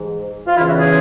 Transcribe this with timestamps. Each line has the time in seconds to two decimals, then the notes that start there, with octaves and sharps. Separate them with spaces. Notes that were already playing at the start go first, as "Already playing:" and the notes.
Already playing: G#2 E3
0.47 F4
0.57 E2 C#3 E3 E4
0.69 F#4
0.79 G#4